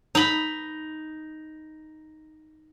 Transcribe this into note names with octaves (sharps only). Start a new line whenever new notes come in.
D#4 B5